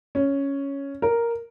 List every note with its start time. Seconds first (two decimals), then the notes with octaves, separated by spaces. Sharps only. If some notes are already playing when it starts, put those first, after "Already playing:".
0.15 C#4
1.02 A#4